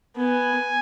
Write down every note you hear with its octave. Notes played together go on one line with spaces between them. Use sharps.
B3 G#5